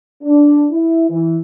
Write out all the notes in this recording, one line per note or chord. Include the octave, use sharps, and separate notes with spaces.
D4
E4
E3